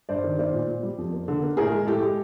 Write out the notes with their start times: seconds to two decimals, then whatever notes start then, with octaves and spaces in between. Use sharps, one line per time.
0.09 G2 C5 D5
0.24 D#3
0.39 A#3 C5 D5
0.53 A#2
0.68 A#2
0.83 G3
0.98 F2
1.13 A#3
1.28 D3
1.43 A#3
1.57 A2 G#4 A#4
1.72 G#3
1.87 A2 G4 A4
2.02 G#3